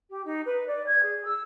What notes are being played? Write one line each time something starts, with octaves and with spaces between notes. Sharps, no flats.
G4
D#4
B4
D5
G#6
G#4
E6